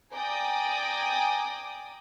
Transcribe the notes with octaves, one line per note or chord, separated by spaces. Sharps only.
D5 G5 G#5 A#5 D6 D#6